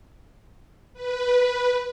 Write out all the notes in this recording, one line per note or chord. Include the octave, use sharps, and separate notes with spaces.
B4